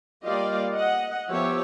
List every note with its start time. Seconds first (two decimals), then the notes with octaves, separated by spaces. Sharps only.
0.24 G3 A#3 F4 D5 D#5 F5
0.74 D#5 F#5
1.30 F3 B3 G4 C#5 E5